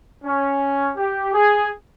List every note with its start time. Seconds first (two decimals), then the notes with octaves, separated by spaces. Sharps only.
0.24 C#4
0.98 G4
1.34 G#4